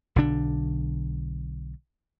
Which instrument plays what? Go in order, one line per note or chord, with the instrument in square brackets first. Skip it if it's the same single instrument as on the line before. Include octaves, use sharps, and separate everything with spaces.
[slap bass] B1 D3 D4